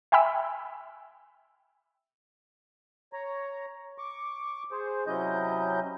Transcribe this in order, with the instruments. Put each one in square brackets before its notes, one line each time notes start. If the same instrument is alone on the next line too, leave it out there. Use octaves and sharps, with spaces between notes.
[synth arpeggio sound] E5 G5 G#5 B5 E6
[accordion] C#5 A#5
C#6 D6
G#4 C5
C3 F#3 C#4 E4 D#5 G6